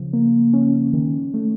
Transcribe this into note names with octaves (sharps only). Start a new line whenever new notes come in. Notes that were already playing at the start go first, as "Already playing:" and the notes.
Already playing: C#3 F3
A#3
C#4
D#3
A3